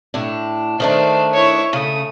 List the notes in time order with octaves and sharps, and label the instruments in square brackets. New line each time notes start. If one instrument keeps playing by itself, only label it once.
[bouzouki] A2 D4
[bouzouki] D#3 A3 D4 [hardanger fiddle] C5 D5
[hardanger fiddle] E4 C#5
[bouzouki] C#3 [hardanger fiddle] A3 D#6